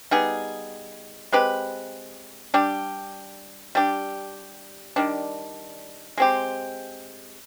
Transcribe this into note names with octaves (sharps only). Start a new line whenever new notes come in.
G3 B3 D#4 G#4
G#3 C4 G4 B4
G3 D4 G4
G3 D4 G4
D#3 G3 D4
G#3 C4 G4